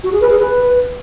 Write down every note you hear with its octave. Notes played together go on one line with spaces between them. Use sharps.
F#4
G#4
B4
G#4
B4